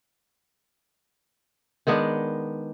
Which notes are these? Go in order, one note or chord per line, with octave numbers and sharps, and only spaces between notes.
D#3 G#3 B3 D4